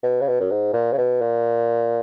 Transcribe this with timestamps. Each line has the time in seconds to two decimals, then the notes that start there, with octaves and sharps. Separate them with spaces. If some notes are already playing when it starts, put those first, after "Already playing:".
0.03 B2
0.21 C#3
0.27 B2
0.40 F#2
0.51 G#2
0.73 A#2
0.92 C#3
0.98 B2
1.21 A#2